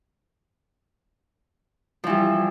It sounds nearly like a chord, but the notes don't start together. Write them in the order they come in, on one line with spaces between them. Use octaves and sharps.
F3 E3 G3